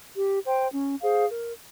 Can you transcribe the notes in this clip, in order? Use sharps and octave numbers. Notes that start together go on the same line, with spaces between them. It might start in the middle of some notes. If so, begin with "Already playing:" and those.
G4
C5 G5
C#4
G#4 C5 F5
A#4